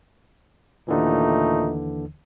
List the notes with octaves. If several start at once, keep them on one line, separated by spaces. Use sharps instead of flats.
D#2 A#2 D3 E3 A3 D#4